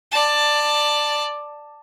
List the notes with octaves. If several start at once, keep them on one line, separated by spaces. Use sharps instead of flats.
D5 A5